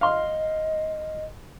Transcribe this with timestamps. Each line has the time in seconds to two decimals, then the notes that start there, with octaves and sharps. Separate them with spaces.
0.01 D#5 F5 C6